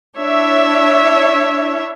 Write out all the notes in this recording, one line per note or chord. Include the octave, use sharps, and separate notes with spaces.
D4 E4 C#5 E5